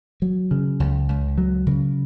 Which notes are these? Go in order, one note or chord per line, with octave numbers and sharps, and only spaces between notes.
F#3
C#3
C#2
C#2
F#3
C#3